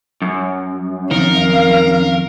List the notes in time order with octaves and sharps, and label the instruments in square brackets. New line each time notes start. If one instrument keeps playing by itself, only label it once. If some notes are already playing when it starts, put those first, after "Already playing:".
[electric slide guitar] F#2
[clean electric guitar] F2 D#3 [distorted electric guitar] A#4 [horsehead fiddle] F5